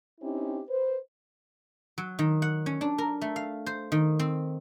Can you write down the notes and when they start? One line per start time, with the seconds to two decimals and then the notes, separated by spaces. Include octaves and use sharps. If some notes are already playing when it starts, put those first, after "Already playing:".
0.20 C4 C#4 D#4 E4 G4
0.67 B4 C5
1.98 F#3
2.19 D#3
2.42 F#5
2.66 C#4
2.81 D4
2.98 A#4
3.21 A3
3.36 F5
3.66 C5
3.92 D#3
4.19 C4